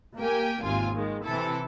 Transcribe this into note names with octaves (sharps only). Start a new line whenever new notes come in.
A#3 G4 A#4 G5 G#5
G#1 D#2 C3 F4 G#5
D#3 G#3
C3 E3 E4 A4